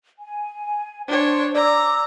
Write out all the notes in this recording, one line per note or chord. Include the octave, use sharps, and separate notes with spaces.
G#5
D4 C5 C#5
D5 A#5 D6 E6